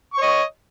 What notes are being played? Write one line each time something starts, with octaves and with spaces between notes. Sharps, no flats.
C#5 D#5 C#6